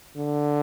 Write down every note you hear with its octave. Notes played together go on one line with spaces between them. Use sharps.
D3